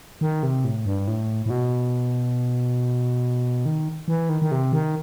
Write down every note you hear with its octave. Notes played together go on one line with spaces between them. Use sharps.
D#3
C3
A2
G2
A2
A2
B2
D#3
E3
D#3
D#3
C3
D#3